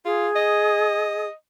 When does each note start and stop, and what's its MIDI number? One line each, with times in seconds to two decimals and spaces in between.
0.05 0.28 65
0.05 1.28 68
0.36 1.33 75